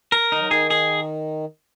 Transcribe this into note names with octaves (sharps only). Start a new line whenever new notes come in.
A#4
D#3 D#4
F#3
D#3 G#4
G#4